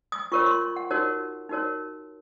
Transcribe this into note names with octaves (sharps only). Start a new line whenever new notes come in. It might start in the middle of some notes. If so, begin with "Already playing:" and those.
D#6
F4 A#4 C#5 C#6
C6
C6
F#5
D#4 F#4 A#4 C#5
D#4 F#4 A#4 C#5